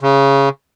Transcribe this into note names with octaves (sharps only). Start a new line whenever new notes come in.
C#3